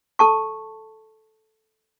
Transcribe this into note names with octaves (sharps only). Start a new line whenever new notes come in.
A4 A5 C#6